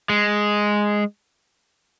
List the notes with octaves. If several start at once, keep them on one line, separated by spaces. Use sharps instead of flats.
G#3